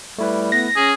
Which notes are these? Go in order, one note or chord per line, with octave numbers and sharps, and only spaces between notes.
G3 A3 E4 B4
B3 A#6
C#4 G#4